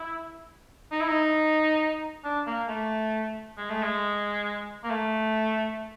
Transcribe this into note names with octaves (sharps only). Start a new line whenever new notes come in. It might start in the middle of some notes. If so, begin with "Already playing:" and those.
Already playing: E4
D#4
E4
D#4
D4
A#3
A3
G#3
A3
G#3
A#3
A3